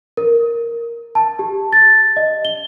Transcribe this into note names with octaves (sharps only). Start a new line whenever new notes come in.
A#4
A5
G4
A6
D#5
G7